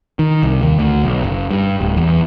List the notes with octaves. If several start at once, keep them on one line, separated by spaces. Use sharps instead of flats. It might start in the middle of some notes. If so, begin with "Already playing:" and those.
D#3
C2
D#2
D2
B1
F#1
G2
D1
E2